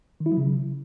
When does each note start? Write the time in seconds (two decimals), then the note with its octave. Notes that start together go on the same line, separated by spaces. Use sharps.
0.20 D#3
0.26 E4
0.32 F#3
0.37 C#3